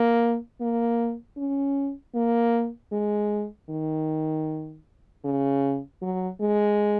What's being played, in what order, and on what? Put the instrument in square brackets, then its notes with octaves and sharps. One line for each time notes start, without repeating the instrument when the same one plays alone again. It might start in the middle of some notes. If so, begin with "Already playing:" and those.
Already playing: [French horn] A#3
A#3
C#4
A#3
G#3
D#3
C#3
F#3
G#3